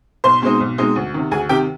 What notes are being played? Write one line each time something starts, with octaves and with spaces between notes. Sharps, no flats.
B1 C5 C6
B2 G#3 C4 D#4
B1
B2 G#3 C4 D#4
D2
C3 D#3
D2 G#4 G#5
C3 D#3 G4 G5